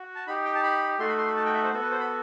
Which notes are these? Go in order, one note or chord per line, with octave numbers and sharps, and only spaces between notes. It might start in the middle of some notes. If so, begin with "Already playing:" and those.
Already playing: F#4
A5
D#4 G4 B5
G5
A5
B5
A3 D#4 F#4 A4 C6
B5
C6
B5
A5
G5
E5
C5
B3 F#4 A4
B4
C5
B5